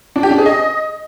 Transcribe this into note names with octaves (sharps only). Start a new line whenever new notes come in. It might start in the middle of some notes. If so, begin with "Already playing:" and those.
D4
G4
D4
G#4
D#5